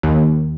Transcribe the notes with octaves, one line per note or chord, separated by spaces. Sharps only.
D#2